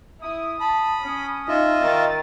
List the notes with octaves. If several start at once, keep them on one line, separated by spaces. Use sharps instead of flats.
E4 D#6
A5 B5
C#4
D#4 F4 D#5 E5
D#3 A6